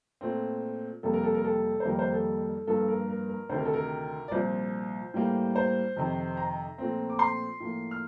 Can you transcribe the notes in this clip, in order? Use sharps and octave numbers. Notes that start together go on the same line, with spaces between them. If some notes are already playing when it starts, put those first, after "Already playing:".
A#2 A3 C4
F2 C3 G3 A#3 A4
A#4
A4
A#4
A4
C5
F2 D#3 G3 A#3 A#4
C5
A4
G2 F3 A#3 A4
A#4
A#4
A#4
D2 C3 D#3 C5
A#4
A4
A#4
D5
C2 A#2 F3 C5
A2 G3 A#3
C5
F2 C3 D#3
A#5
A#2 F3 A3 C4
D6
C6
A2 F3 A#3
F6